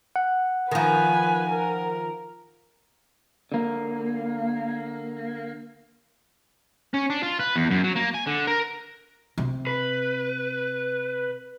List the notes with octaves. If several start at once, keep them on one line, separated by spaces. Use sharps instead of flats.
F#5
D#3 F3 B4 G#5
A#4
D3 A#3
C#4
D4
F4
B4
E2
F#2
F#3
A#3
G#5
D3
A#4
C3
B4